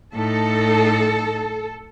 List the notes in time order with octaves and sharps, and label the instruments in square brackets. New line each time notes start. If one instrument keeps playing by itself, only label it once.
[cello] A2 D#4 [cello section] A4